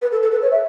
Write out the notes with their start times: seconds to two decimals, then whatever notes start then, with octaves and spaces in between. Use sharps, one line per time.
0.02 B4
0.12 A4
0.22 A4
0.31 B4
0.42 C#5
0.51 E5